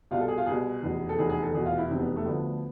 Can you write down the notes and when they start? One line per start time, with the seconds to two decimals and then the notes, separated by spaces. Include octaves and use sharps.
0.11 C2 B2 F4
0.20 A4
0.28 G#4
0.38 F4
0.46 C2 B2 G#4
0.82 F1 E2 B2
1.09 A4
1.18 F1 E2 B2 G#4
1.30 G#4
1.42 A4
1.54 F1 E2 B2 G#4
1.66 F4
1.78 E4
1.90 F1 E2 B2 C4
1.99 B3
2.16 A3
2.25 D2 D3 F3 B3